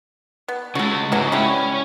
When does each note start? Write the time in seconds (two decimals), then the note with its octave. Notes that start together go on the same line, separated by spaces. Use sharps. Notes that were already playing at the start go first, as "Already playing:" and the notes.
0.48 B3
0.75 C#3 G#3 F#4 A4
1.12 G#2 C#3 E3 F#3
1.32 C#3 G3 C#4 E4